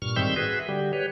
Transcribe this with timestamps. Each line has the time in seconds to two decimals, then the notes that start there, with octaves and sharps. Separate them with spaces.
0.02 G2 A#2 C#6 F6
0.16 G#2 D#3 G3 C4 E5 G6
0.36 F#4 G#4 B4 E5
0.68 D3 G3 G4
0.93 G4 B4 C#5